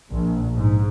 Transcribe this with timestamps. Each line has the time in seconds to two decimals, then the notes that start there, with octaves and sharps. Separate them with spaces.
0.12 A#1
0.55 G#2